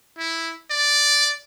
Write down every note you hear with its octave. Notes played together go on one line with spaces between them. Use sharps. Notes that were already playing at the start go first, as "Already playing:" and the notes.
E4
D5